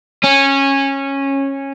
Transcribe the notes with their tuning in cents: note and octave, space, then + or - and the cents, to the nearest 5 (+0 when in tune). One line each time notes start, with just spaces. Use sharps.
C#4 -15